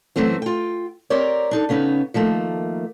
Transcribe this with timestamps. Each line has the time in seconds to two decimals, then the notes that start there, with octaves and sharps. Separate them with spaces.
0.16 F#2 E3 F#3 A3 C4 F#4
0.42 F4 G5
1.10 C4 G4 A#4 C#5 D5
1.51 D4 D#4 A4
1.69 C#3 B3 C#4 D#4
2.14 D#3 F3 A3 A#3